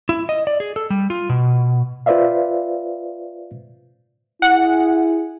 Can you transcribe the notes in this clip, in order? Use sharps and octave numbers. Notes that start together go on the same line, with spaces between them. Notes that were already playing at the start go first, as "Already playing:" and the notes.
E4
D#5
D5
G#4
A4
G3
F4
B2
F4 B4 C5 D5 E5 F5
E4 G#4 F#5